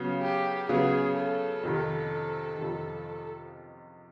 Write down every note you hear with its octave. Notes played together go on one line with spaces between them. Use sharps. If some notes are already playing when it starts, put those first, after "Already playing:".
Already playing: C#3 F#3 B3
G4
C#3 F#3 B3 G#4
A4
F2 C3 D#3
F2 C3 D#3